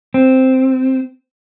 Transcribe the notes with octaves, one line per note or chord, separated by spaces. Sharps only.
C4